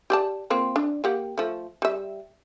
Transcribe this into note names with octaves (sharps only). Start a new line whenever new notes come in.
G4 D5 A5
A#3 C4 F4
D4
A#3 G4 F#5
F3 A3
G3 E5